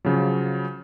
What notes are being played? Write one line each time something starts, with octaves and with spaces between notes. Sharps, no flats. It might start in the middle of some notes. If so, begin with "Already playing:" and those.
C#3 F3 F#3